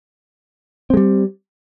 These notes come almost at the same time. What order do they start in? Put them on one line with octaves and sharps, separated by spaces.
C4 G#3 G3